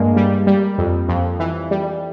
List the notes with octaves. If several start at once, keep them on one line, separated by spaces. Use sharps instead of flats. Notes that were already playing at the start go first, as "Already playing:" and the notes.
Already playing: G2 G#3 A#3
G3
G3
F2
F2
E3
G3